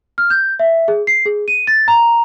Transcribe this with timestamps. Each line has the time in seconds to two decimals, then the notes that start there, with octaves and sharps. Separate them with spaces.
0.18 F6
0.30 G6
0.59 E5
0.88 G#4
1.07 C7
1.26 G#4
1.48 D#7
1.67 A6
1.88 A#5